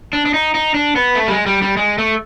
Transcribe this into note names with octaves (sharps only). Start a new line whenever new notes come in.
D4
D4
D#4
D#4
D4
B3
A3
G3
G#3
G3
G3
G#3
A3